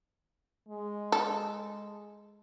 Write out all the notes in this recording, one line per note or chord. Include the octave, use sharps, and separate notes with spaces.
G#3
A4